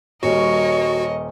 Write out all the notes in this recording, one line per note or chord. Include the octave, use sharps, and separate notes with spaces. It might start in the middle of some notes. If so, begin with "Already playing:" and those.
D#1 G3 F#4 A#4 C#5 D#5